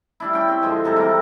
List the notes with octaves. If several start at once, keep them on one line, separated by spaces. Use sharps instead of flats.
G3 D4 E4
C#4 G5
C4
D3 F3 G#3 C5
C3 G3 A4 A#5
C3 E3 A#4